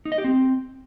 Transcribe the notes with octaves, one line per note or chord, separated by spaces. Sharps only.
D#4
D#5
G4
C4